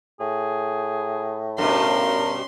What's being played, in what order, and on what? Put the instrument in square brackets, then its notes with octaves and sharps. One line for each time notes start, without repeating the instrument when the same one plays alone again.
[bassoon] A2 [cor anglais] G#4
[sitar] G2 B2 [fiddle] C#4 C6 [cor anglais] A#4